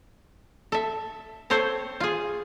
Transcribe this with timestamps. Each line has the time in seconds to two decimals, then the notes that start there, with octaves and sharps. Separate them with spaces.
0.72 A4 E5
1.50 C4 A4 C5 C#5
2.00 F4 G#4